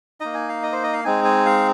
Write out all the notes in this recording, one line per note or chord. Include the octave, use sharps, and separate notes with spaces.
A#3 D#4 D#5
G#5
F5
D#5
C5
D#5
F5
G#3 C4 D#4 G#5
G#5
F5